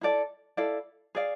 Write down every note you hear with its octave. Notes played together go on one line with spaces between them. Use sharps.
E4 A4 D5
E4 A4 D5 F5
G#4 D5 F5